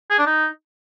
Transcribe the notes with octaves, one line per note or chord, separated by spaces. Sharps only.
G#4
D4
D#4